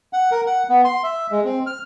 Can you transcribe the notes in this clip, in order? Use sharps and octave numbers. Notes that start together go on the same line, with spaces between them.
F#5
A#4
F#5
B3
C6
E5
G#3
C4
F6